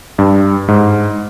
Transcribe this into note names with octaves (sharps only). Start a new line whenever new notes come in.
G2
G#2